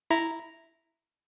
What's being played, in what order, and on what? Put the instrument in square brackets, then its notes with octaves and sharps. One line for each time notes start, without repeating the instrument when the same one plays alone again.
[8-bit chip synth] E4 A#5